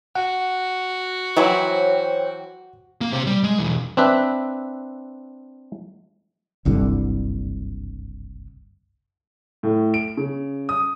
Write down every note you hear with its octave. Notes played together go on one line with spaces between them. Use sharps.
F#4 F#5
E3 F#3 E4 C5 C#5 G5
A#3
C3 C5
G3
G#3
B1 E2
C4 D4 B4 E5
F#1 C2 G2 D3
A2
D7
C#3
D#6